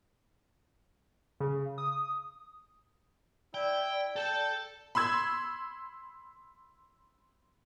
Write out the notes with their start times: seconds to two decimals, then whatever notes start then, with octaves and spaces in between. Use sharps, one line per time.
1.40 C#3
1.78 D#6
3.54 E4 D5 G5
4.16 A4 G5 A5
4.95 B5 C6 E6 G#6